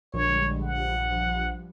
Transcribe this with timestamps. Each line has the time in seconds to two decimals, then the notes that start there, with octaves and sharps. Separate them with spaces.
0.14 A#1 D3 G3 G#3 C#5
0.63 G2 F3 G3 F#5